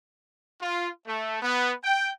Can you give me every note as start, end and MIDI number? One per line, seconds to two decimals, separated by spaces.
0.61 0.89 65
1.07 1.38 57
1.42 1.72 59
1.84 2.09 79